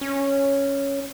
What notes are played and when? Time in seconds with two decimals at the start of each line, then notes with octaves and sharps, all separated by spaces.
0.01 C#4